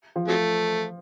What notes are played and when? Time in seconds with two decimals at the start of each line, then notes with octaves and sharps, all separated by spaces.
0.16 F3
0.28 C3 F#3 A3